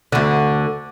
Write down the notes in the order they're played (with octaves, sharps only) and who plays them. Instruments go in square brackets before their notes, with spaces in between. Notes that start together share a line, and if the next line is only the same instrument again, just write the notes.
[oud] D2 D3